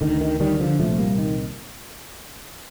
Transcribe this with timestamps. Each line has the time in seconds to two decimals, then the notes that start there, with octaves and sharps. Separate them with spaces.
0.01 D2 D3 D#3
0.21 D#3
0.40 D#3 G3
0.60 D3 F3
0.79 C2 A#2 F3 A3
0.99 G3 A#3
1.18 D#3